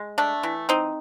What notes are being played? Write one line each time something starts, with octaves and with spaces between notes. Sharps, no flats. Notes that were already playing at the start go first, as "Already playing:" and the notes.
Already playing: G#3
A3 D4
E3
C4 D#4